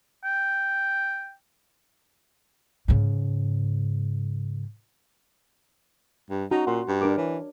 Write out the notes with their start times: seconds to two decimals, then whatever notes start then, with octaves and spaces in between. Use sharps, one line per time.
0.24 G5
2.88 G#2 C#3
6.30 G2
6.51 C#4 D#4 F#4 A#5
6.67 A#2 F#5 C6
6.88 G2
7.01 D4 A#4 D6
7.17 E3 C#5